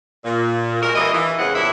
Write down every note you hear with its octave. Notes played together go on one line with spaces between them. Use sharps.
A#2
G#3 F#4 A#4
G2 E3 A#3 D#5
E3
E2 C#3 G#3 C4 F#5
G2 A#2 E4